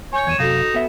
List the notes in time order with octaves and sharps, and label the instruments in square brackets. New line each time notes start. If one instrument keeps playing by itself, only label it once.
[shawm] C#5 [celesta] G#5 G6
[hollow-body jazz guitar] E2 [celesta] G#6 D#7 E7
[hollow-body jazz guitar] F#2 C3 F5 [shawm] D#4 [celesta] F#4 A4 E7
[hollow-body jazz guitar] B3 E5